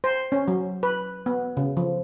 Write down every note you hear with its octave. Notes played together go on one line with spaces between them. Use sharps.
C5
C#4
F#3
B4
B3
C#3
F3